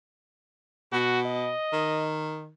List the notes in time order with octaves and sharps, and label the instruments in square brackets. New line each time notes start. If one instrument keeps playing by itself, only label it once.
[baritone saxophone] B2 [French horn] F#4
[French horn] D#5
[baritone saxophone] D#3